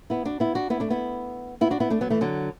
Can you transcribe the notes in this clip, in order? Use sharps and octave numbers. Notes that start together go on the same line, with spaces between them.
B3 E4
D4 F#4
B3 E4
D4 F#4
B3 E4
A3 D4
B3 E4
B3 E4
D4 F#4
B3 E4
A3 D4
F#3 B3
E3 A3
D3 F#3